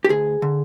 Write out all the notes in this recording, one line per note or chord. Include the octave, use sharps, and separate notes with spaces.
G4
D2 G#4
D3